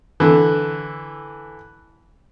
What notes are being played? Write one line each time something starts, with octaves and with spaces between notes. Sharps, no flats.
D3 E3